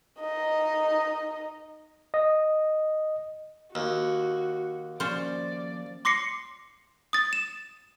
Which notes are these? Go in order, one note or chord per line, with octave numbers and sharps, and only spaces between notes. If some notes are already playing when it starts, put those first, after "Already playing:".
D#4 D#5
D#5
D#2 F#4
F3 A#3 C#4 C5 D5
C6 D6 A#6 C7 C#7
D#6 A6
E7